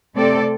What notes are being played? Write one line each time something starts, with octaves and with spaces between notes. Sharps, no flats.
C3 A3 C4 A4 D5